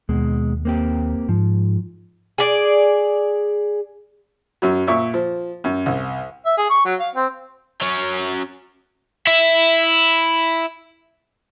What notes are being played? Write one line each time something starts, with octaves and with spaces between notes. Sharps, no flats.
D#2 B2 G#3
A#3 C4 G4
G#2 F3
G#4 D5
F#2 F#3
A#2 E5 C#6
F3
F#2
C2
E5
G#4
C#6
F#3
F5
C4
F#3 C#4
E4 E5